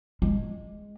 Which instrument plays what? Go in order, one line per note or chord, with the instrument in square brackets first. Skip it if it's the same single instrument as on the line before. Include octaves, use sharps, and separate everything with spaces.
[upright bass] G#3